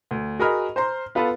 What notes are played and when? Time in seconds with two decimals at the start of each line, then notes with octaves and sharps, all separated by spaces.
0.11 D2
0.39 F#4 G#4 A#4 D#5 B5 F6
0.76 C5 A#5 C6
1.15 B3 F4 A4 B4